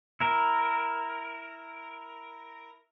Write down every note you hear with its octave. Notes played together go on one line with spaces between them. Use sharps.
E4 A#4